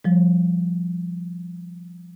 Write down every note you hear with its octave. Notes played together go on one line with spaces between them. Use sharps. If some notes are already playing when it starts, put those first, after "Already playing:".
F3 G3